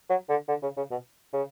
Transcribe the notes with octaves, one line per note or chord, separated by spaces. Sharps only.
F#3
D3
D3
C#3
C#3
B2
C#3